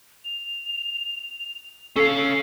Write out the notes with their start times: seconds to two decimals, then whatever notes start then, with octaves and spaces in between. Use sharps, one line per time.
0.25 F7
1.96 C#4 A4 F5 C7